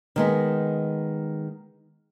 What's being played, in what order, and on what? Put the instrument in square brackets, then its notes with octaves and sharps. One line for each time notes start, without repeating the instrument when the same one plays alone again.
[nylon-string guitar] D#3 G#3 B3